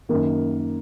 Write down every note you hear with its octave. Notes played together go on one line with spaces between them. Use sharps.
F#2 D#3 A#3 A#4